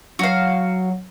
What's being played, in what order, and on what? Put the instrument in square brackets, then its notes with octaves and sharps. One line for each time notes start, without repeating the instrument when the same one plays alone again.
[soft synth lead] F#3 [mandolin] F#4 F5